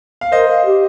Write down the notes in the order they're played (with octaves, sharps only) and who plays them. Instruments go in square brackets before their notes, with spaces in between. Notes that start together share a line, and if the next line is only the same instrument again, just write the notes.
[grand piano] F5
[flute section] A#4 [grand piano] C5 D#5
[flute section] F5
G4